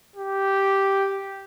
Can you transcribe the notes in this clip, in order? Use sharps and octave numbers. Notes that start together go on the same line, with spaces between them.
G4